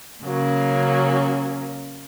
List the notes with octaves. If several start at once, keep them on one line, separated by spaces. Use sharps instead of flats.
C#3 F#3 A#3 C#4